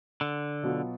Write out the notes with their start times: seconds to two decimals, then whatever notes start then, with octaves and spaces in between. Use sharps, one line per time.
0.21 D3
0.63 B2 F#3 B3 F4